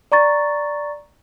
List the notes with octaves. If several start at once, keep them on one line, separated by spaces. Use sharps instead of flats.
D5 A#5 C#6 A6